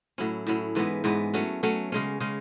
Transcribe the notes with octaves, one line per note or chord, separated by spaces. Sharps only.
A2 F#3 C#4 E4
A2 F#3 C#4 E4
G#2 E3 G#3 B3
G#2 E3 G#3 B3
F#3 A3 C#4
F#3 A3 C#4
C#3 G#3 C#4
C#3 G#3 C#4